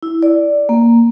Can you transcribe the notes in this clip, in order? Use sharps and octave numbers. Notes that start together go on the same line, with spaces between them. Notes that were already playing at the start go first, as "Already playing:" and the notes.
E4
D5
A#3